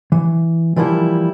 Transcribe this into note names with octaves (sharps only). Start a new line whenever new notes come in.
E3
E3 F3 G3 A#3 E4